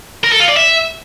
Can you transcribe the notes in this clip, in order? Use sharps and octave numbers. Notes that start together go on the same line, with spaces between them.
A#4
A4
F4
D5
E5